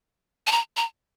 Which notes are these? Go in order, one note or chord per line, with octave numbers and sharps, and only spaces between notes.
A5
A#5
A#5